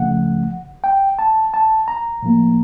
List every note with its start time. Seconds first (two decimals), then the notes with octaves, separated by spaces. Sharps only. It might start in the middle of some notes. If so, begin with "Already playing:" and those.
Already playing: C#2 C#3 F3 A3 F#5
0.84 G5
1.19 A5
1.54 A5
1.88 A#5
2.22 A2 F3 A#3